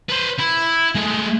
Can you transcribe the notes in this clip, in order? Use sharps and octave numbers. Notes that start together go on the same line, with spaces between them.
B4 C5
E4
G#3 A3